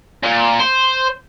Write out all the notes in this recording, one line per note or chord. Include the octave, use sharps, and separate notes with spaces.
A#2
C5